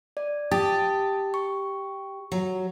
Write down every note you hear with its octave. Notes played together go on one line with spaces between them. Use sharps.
D5
G4 A5 D#6 A6
C#6
F#3